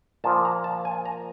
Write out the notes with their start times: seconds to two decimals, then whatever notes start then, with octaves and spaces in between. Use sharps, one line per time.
0.24 A#2 F3 A#3 A5
0.45 A#5
0.64 A5
0.85 G#5
1.06 A#5